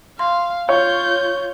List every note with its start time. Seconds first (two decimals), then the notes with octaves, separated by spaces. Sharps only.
0.19 F5 C6
0.69 F4 C#5 G6